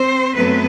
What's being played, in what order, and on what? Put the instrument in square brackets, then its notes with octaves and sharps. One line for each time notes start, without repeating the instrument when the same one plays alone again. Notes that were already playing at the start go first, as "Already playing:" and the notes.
Already playing: [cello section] C4 C5
F#2 F#3 A3 B3 C4 B4